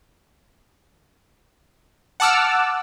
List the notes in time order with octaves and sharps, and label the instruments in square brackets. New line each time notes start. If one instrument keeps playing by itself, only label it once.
[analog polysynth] F#5 A5 D6 E6 F6